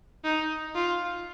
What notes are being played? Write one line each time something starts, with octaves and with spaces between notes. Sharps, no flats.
D#4
F4